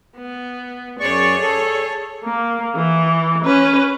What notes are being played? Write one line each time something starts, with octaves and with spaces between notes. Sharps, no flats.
B3
F#2 G#4 C#5 D5 C#6
A4
A#3
E3
C#4 B4